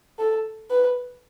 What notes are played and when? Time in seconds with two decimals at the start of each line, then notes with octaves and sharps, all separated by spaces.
0.19 A4
0.70 B4